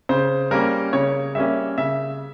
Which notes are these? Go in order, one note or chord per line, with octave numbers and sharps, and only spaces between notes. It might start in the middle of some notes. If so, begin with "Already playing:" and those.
C#3 C5
G3 A#3 C#4 A#4
C#3 C#5
G3 A#3 C#4 E5
C#3 E5